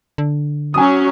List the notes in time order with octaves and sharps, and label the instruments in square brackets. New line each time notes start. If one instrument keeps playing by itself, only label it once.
[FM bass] D3
[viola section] F#3 C#4 [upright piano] G#5 D#6